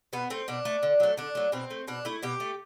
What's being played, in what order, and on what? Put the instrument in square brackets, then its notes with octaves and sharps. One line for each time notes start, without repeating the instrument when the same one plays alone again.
[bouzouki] B2 B3
A3 C4
B2 D4
A3
D3
F#3 A3
D3 D4
F#3 A3
B2 C4
A3
B2 D4
A3 E4
B2 G4
A3